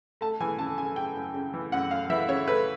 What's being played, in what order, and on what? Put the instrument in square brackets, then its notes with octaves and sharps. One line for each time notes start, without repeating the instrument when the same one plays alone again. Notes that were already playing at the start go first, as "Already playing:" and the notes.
[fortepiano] A3 A5
E3 G#5
F#2 A5
F#2 G#5
C#3 G5
F#2
C#3
E3
F#2 F#5
F#2 F5
E3 E5
C#3 C#5
A3 B4